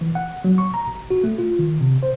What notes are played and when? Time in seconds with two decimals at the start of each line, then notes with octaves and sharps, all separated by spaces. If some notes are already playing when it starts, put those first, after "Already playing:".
0.01 E3
0.15 F#5
0.44 F#3
0.58 C#6
0.74 A#5
0.87 G#1
1.10 F#4
1.24 A3
1.38 F4
1.59 D#3
1.81 C3
2.03 C5